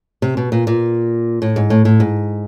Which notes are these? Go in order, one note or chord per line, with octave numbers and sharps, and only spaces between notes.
C3
B2
A#2
A#2
A2
G#2
A2
A2
G#2